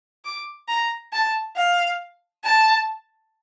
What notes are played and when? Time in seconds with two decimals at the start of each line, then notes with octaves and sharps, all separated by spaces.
0.25 D6
0.68 A#5
1.13 A5
1.56 F5
2.45 A5